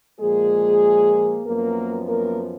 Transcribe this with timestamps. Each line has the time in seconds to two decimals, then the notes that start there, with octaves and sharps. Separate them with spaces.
0.19 A#2 F3 G#3 A#3 G#4
1.45 F#2 F3 A#3 B3 A#4
2.07 A#3 A#4